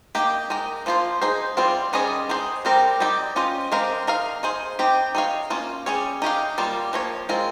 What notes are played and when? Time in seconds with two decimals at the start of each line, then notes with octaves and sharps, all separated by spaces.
0.15 A#3 D#4 G4
0.50 G#3 D#4 A#4
0.86 F3 A#3 F4 C5
1.22 D#4 G#4 C5
1.57 G3 C4 F4 C5
1.93 D#3 G3 C#4 G#4 D#5
2.29 G#3 D#4 G#4 C5
2.65 G3 C4 G4 A#4
3.00 G3 C4 D#4 G4
3.36 C#4 F4 C5 D#5
3.72 G#3 C4 G4 A#4 F5
4.07 D#4 A#4 F5
4.43 D#4 G#4 C5
4.79 C4 D#4 G4
5.15 D#4 G#4 C#5 F5
5.50 A#3 C#4 F4
5.86 G3 C#4 G#4 C#5
6.22 D#4 G4 C#5 F5
6.58 G3 A#3 F4
6.93 F3 A#3 C#5
7.29 G#3 C4 F4 A#4